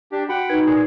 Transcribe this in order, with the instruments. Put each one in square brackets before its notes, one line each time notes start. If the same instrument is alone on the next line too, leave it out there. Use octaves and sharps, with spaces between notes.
[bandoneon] D4 G4
[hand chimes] F#4 [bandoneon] F#5 G5 B5
[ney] D#4 [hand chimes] B4 G#6
[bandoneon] A#2 G#4